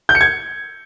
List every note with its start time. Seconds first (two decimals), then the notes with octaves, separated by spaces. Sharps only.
0.09 G6
0.15 C#7
0.21 G#6